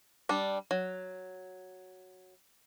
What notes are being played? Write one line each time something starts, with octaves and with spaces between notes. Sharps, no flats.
G3 D4
F#3